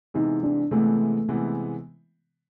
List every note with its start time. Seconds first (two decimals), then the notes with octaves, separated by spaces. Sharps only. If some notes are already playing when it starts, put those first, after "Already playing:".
0.14 C3 E3 G#3 B3 D#4
0.43 D4
0.71 C3 E3 G#3 A3 B3
1.29 C3 E3 G#3 B3